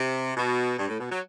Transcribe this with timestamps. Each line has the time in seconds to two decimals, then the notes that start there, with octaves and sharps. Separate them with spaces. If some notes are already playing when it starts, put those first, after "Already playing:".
Already playing: C3
0.36 B2
0.78 G2
0.89 A2
0.99 B2
1.10 F#3